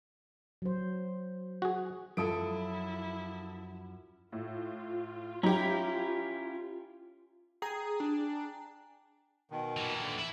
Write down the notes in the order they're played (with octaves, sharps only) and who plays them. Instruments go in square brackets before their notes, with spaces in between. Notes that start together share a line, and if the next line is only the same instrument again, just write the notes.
[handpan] F#3 C5
[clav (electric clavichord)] F#4 G#4
[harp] F#2 [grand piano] F3 [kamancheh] E4 [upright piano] A4 D#6 D7
[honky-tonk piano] A2 [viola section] F4
[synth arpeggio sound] F#3 D#4 [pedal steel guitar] C#4 E4 [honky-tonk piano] G4 A#5
[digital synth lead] G#4 [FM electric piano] G5 G#5 A#5
[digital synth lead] D4
[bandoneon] B2 D#3
[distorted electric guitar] A#2 E3
[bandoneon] D3
[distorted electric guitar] E4